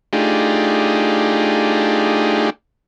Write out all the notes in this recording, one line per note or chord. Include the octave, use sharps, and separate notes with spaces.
A3 D4 D#4 F4 G4 G#4